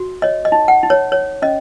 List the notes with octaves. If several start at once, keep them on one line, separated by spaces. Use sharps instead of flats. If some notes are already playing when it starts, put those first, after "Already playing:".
Already playing: F#4
C#5 D#5
D#5
D#4
F#5
D#4
C#5
C#5
C#4 D#5